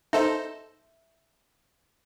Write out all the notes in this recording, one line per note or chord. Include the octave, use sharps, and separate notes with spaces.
D#4 A4 C5 E5